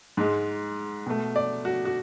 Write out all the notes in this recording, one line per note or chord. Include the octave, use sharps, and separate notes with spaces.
G#2 G#3
B2 A3
D5
F#4
F#4